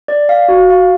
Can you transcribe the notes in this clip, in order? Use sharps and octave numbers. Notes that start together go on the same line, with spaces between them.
D5
F5
F#4
F5